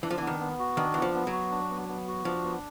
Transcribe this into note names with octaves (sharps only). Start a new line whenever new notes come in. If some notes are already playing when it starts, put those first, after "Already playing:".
E3 D4
F3
E3 B3
D#3
B3
F#4
D#3 D4
E3 B3
F3
B3
F#3
F#4
D4
B3
B3
F#4
F3 D4
B3